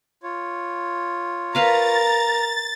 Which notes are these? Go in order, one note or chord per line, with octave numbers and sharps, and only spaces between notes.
F4 C#5
A#4 B4 F5 A5 A#5 A6